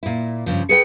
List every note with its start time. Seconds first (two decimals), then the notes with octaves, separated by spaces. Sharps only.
0.03 A#2 E4
0.46 G2 C#3 F3
0.69 G#4 B4 G5 C#7